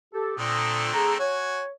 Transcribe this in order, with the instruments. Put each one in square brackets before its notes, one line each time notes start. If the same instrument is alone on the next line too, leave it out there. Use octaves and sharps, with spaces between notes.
[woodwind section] G4 A4
[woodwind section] A#2 A#5 D#6 [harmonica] D3 A3 C4
[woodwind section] G#4 A#5
[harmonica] F#4 G#5 [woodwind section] C#5